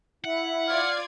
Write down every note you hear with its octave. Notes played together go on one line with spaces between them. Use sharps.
E4 E5 F#5
F4 D5 F6 G#6